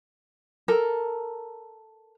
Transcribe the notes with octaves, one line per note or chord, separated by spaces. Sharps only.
A4 A#4